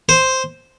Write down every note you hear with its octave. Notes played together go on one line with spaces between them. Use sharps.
C5